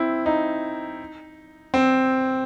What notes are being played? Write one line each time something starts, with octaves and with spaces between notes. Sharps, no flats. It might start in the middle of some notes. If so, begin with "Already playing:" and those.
Already playing: C4 E4
D#4
C4